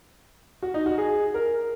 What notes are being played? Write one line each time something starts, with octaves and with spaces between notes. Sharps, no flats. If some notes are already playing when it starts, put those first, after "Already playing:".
F#4
D#4
F#4
G#4
A#4